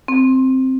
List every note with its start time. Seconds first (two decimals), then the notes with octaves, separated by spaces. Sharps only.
0.08 C4